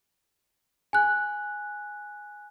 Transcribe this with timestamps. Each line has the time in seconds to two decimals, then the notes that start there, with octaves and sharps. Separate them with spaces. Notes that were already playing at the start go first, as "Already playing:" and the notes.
0.93 G#5 F#6